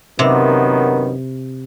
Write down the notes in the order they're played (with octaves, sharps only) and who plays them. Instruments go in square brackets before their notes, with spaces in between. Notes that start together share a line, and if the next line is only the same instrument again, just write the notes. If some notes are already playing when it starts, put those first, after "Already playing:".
[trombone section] F#2 D#3 B3 [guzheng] C3